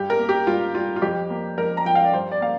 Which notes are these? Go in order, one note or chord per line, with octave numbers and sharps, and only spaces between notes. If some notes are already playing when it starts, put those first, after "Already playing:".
Already playing: G2 G4
A#4
A#3
G4
G2 F4
G3 F4
F4
F2 G4
A#3
F2 A#4
A#5
F3 G5
F5
D5
G2 C5
D5
A#3 F5